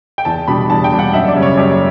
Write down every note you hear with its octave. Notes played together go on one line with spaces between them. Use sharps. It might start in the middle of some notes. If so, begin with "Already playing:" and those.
G5
E2 A5
B2 G3 D4 B5
E2 A5
G5
B2 G3 D4
F#5
F#2 E5
D5
C#3 G3 C#4
C#5
F#2 G4